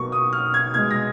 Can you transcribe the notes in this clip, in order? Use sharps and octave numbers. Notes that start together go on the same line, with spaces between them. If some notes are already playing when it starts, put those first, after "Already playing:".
Already playing: B2 F#3 A#3 C#6
D#6
F6
G#6
B2 G#3 G#6
A#6